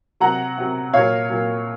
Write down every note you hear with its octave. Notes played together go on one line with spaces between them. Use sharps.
C3 F#3 F#5 A#5
C3 F#3
A#2 F#3 C#5 F5
A#2 F#3